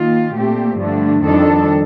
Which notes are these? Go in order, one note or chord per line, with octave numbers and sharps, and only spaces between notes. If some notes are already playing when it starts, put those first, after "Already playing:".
Already playing: D#3 A#3 F4
A#2 A3 C4 G4
G2 D3 F3 A3 D4
F2 D#3 G3 D4 A4